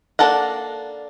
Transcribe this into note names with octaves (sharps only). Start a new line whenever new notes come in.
A#3 D4 A4 A#4 F#5